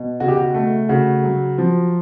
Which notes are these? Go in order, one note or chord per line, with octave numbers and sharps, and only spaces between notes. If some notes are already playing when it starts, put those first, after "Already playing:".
Already playing: B2
C#3 F#4
G4
F#4
A3
C#3 F#4
F#3
F3